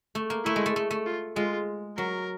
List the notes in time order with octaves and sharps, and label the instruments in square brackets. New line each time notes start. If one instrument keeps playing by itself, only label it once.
[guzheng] A3
A#3
[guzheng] A3 [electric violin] E4
[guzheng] G#3
A3
A3
A3
[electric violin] F4
[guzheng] G#3 [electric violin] F4
[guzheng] F#3 [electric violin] A#4